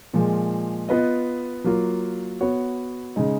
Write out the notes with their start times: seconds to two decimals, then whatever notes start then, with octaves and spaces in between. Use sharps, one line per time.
0.14 A#2 F3 G#3
0.89 B3 F4 B4 D#5
1.64 F#3 A#3 F4 A#4
2.41 B3 F#4 C#5
3.16 C#3 G#3 D#4